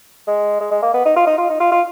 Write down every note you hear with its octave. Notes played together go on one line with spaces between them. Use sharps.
G#3
G#3
G#3
A#3
B3
D#4
F4
D#4
F4
D#4
F4
F4